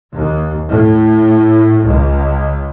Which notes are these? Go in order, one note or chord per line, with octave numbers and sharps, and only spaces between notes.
D#2
A2
C#2